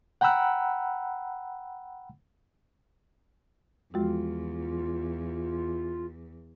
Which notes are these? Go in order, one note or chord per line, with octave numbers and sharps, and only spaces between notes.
F#5 G5 A#5 B5 E6 F#6
E2 F3 G#3 F4 F#4